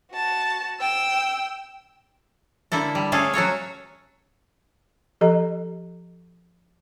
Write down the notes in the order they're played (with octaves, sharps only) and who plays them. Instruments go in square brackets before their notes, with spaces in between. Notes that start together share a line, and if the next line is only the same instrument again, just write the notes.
[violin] F#4 A5
G5 E6
[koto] D3 A#3 E4 A4
G3
A3 C#4 G#4 A4 F5
F#3 F#4 A4 C#5
[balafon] F3 G4 A4 D#5 A#5